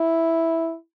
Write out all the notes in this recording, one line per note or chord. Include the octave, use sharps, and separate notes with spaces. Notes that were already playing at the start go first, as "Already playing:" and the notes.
Already playing: E4